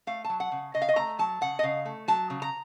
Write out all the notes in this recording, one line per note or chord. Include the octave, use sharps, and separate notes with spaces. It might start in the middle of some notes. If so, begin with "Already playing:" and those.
A3 F5
F#3 A5
F#5
C#3
C#3 D#5
F5
D#5
A3 A#5
F#3 A5
C#3 F#5
D#5
C#3 F5
A3
F#3 A5
C#3
A#5